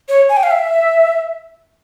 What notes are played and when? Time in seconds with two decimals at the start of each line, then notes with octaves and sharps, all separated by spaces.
0.09 C#5
0.29 G#5
0.37 G5
0.43 F5
0.51 E5